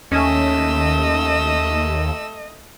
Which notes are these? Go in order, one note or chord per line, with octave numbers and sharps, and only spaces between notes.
D#2 A3 C#4 D#5 E6